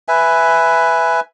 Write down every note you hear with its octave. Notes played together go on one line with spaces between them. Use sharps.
B4 E5 G#5